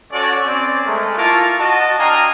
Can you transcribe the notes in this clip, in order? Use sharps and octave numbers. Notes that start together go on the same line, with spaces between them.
C#4 F#4 A4 C#5 D5
C4 C#4 D5
G#3 A3 A#4
E4 F4 A#4 A5 C#6 D6
F#4 D#5 A5
D4 D#5 F5 G5 G#5 A#5